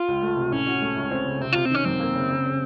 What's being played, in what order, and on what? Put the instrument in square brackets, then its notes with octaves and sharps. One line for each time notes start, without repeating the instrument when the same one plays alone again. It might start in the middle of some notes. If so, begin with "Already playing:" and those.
Already playing: [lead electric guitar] F4
[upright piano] C#2
A3
C3
[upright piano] A2 [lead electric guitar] C#4
[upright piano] F#4
A3
C#2
C4
C#3
[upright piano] C3 [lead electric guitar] C4
[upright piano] C3 [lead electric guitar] F4
[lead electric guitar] C4
[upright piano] D#3 [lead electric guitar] C#4
[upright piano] F#2 [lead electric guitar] C4
[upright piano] A#3
C#3
C#3
C#3